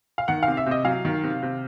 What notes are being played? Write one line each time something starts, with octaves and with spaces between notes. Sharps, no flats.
F5
D#3 F#5
C3 F5
E5
C3 D#5
F#3 F5
D#3
C3
C3